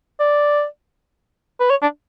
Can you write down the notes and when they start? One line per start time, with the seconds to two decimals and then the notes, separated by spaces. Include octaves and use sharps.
0.20 D5
1.60 B4
1.70 C#5
1.82 D4